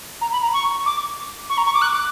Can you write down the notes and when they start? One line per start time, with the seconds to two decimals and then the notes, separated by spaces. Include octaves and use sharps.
0.21 A#5
0.32 B5
0.42 A#5
0.53 C#6
0.86 D6
1.49 C#6
1.57 A#5
1.65 C#6
1.74 D6
1.81 F#6
1.93 D6